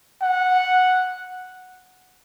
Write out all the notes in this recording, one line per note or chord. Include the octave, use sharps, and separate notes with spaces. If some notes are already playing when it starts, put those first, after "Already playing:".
F#5